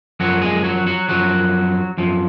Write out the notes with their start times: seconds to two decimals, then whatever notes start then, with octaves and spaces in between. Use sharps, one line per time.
0.20 F#2 F3 F#3 F#4
0.41 G#3 G#4
0.64 F#3 F#4
0.86 F#3 F#4
1.09 F#2 F3 F#3 F#4
1.98 F#2 F3